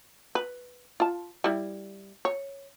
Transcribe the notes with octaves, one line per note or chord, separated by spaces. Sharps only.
B4
F4 A5
G3 E4
C#5